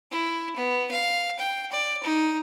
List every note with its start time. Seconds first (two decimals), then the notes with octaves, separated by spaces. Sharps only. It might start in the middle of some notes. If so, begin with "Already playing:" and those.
0.12 E4
0.56 B3
0.91 F5
1.39 G5
1.72 D5
2.03 D#4